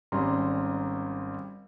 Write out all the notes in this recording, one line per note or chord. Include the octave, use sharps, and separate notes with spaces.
G#1 G3 C#4 A#5 C6